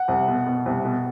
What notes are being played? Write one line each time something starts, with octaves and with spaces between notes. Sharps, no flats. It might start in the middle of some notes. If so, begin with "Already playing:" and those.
Already playing: F#5
C2
B2
B2
C2
B2